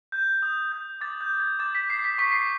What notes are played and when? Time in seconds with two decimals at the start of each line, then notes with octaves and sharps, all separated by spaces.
0.12 G6
0.42 D#6
0.72 G6
1.01 D6 A6
1.21 G6
1.31 G6
1.40 G#6
1.59 D6 A6
1.75 B6
1.89 G6 C7
2.04 B6
2.18 C#6 B6
2.32 C7